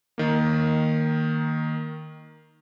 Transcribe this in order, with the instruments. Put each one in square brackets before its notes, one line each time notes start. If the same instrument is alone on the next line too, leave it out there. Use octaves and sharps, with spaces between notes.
[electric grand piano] D#3 A#3